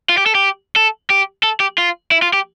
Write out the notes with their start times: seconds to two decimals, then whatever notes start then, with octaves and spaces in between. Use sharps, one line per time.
0.09 F4
0.17 G4
0.26 A4
0.35 G4
0.76 A4
1.10 G4
1.43 A4
1.60 G4
1.78 F4
2.11 E4
2.22 F4
2.33 G4